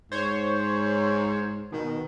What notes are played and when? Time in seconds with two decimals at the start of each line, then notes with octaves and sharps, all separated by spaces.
0.12 G#2 C5 C#5
1.72 B2 D#3